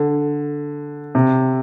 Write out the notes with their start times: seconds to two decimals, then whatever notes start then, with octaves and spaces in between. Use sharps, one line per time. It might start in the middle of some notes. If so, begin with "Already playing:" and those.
Already playing: D3
1.15 C3